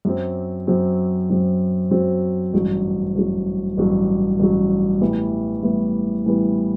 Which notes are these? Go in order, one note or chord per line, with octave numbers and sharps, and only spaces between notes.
F#2 F#3 C4
F#2 F#3 C4
F#2 F#3 C4
F#2 F#3 C4
A1 G2 F#3
A1 G2 F#3
A1 G2 F#3
A1 G2 F#3
A2 E3 G3 B3
A2 E3 G3 B3
A2 E3 G3 B3